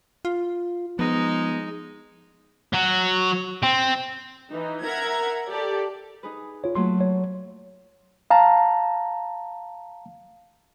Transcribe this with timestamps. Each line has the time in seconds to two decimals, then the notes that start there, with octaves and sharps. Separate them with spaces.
0.25 F4
0.99 F3 G#3 B3 D#4
2.73 F#3 F#4
3.63 C4
4.54 E3 D#4
4.83 A#4 E5 F#5 A#5 G#6
5.49 G4 A4 D5
6.23 D#4 G#4 B4
6.64 F4 C#5
6.75 F#3 A3 A#3 C6
7.01 C#5
8.30 F5 A5 A#5